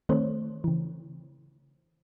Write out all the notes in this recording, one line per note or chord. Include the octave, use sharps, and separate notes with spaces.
D#3 A3 C4 C5 C#5
C#3 E3